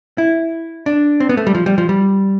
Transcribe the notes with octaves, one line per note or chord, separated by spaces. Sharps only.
E4
D4
C4
B3
A3
G3
F3
G3
F3
G3